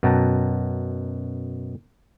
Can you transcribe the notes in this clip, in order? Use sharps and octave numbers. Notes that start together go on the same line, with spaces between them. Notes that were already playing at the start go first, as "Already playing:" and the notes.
F#2 B2 F#5 G5 A5 A#5